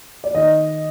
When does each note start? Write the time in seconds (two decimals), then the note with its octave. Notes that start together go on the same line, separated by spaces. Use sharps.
0.24 D5
0.34 D#3 D#5